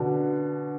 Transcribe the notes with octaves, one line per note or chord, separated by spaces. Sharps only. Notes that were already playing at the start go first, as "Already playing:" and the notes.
Already playing: B2 D3